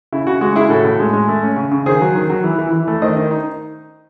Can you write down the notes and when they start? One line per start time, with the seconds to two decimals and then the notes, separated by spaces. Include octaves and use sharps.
0.13 C#3 E4
0.27 C#3 F#4
0.41 G#3 F#4
0.56 C#3 E4 G#4
0.70 A2 F#4 A4
0.85 A2
1.00 G#3
1.13 G#3
1.28 A3
1.43 C#4
1.57 C#3
1.71 C#3
1.86 D#3 G#4 C5
2.01 F#3
2.16 D#3
2.30 F#3
2.44 E3
2.59 E3
2.72 E3
2.88 A3
3.02 D#3 C5 D#5
3.17 D#3
3.31 D#4